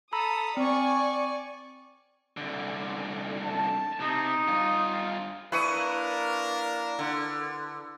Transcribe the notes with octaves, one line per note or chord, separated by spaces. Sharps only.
A4 A#5 B5 D#6 E6
C4 D5 G#5 C#6
C2 D3
A5
C3 D#4
G2 F4
A#3 D4 E4 A#4 B4 C#6 D#6
D3